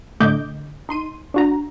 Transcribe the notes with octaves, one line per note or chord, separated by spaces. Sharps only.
A2 D3 A3 D#5 D6 G6
D#4 C6 D#7
D4 F#4 A#5